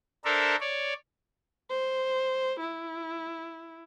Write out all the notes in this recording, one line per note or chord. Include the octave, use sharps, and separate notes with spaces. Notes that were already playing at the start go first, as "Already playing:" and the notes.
D4 A4 A#4 C5 E5
C#5 D5
C5
E4